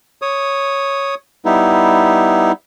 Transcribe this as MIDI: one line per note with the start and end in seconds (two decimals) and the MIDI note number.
0.22 1.15 73
0.22 1.15 87
1.45 2.52 55
1.45 2.52 59
1.45 2.52 63
1.45 2.52 64